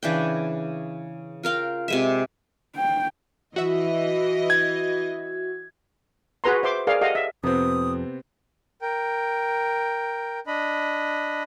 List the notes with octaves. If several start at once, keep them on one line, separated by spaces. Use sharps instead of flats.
C#3 E3 D4 G5
F4 A#4 F5 G5
C3 G#3 E5
G5
E3 F#4 D#5 E5
G#6
F#4 G#4 B4 A#5 C6
C5 E5 C6 D6
G#4 A#4 D5 F5
G4 A4 D#5 F5 F#5
E5
F2 C3 B3 C4 D#6
A#4 G5
D4 D#5 B5